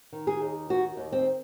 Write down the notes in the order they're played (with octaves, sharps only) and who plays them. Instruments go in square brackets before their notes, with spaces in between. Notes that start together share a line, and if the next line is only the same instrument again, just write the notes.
[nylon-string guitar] D#3
G#4
D#2
D#3 F#4
D#2
C4